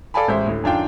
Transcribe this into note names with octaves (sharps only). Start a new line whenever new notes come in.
A4 D5 F5 G#5 A5 B5
A1 G#3 C5 E5
D2 A2
F#2 D#3 D4 F4 F5 G5